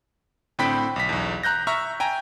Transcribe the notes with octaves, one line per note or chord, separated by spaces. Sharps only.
A2 D3 C4 G5 B5 B6
B1 B6
B1 E2
A#5 F#6 G6 A#6
E5 A#5 C#6 F6
G5 G#5 A#5